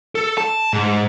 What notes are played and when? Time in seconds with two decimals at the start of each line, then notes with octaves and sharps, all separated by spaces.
0.15 A4
0.38 A5
0.73 G#2